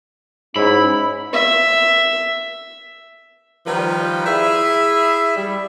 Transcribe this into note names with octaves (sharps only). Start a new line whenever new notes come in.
G#2 F#3 C#4 E4 B5
E5
D#3 F3 G3 B4
E4 G#4 E5
G3